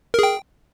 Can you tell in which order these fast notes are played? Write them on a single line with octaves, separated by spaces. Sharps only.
A#4 G#4 G5